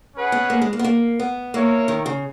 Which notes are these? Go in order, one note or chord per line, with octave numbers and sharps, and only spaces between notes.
C#4 G#4 B4 F#5
B3
A#3
G#3
A#3
B3
A#3
B3
A#3 E4 A#4 C#5
D#3
C#3